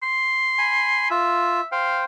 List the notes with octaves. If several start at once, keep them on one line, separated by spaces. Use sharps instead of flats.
C6
G#5 B5
F4 E5
C5 F5 G5